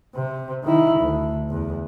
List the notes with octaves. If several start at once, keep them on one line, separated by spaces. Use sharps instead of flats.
C3
D#3 E4
D2
E2